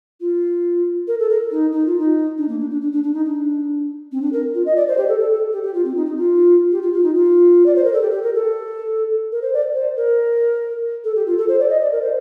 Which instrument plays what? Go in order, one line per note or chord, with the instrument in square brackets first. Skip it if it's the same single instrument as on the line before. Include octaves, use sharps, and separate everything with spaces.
[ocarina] F4
A#4
A4
A#4
D#4
D#4
F4
D#4
D4
A#3
D4
D4
D4
D4
D4
D#4
D4
C4
D4
A#4
F4
D#5
D5
C5
G4
A4
A4
A4
G4
G4
F4
C4
D#4
D#4
F4
G4
F4
F4
D#4
F4
D5
C5
A#4
A4
G4
G4
A#4
A4
A#4
C5
D5
C5
A#4
A4
G4
F4
A4
C5
D5
D#5
D5
A#4
C5